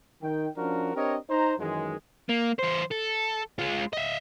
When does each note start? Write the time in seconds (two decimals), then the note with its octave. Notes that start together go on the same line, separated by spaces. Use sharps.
0.21 D#3 G5
0.56 F3 C#4 D4 F#4 A#4
0.95 C4 D4 G4 A#4 C#5 D#5
1.30 D#4 C5 A#5
1.59 F#2 D#3 E3 G#3
2.29 A#3
2.59 E3 C5
2.92 A4
3.59 G#3 F4
3.93 D#5 E5